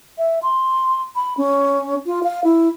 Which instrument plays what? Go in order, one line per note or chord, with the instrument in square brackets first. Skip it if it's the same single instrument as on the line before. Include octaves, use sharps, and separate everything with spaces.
[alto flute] E5
C6
B5
C#4
F4
F5
E4